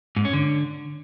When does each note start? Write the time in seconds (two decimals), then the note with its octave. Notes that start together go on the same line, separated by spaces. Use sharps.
0.16 G#2
0.25 C#4
0.33 D3